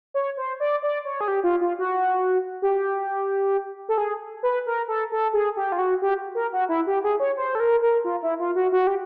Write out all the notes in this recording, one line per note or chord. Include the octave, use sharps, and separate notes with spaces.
C#5
C5
D5
D5
C#5
G#4
G4
F4
F4
F#4
G4
A4
G#4
B4
A#4
A4
A4
G#4
G4
F4
F#4
G4
A#4
F#4
E4
G4
G#4
C#5
C5
A4
A#4
A#4
F4
E4
F4
F#4
F#4
G4